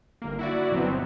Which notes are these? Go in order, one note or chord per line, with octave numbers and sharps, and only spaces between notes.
G1 A#3
E4 F#4 D5
G1 B2 F#3 B3 C4